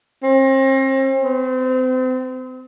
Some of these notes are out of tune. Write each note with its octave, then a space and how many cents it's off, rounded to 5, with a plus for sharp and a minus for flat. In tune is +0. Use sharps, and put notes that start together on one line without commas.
C4 +40
C4 -35